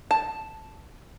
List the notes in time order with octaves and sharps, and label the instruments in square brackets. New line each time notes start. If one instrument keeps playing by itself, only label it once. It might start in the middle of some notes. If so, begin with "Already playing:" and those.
[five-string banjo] A5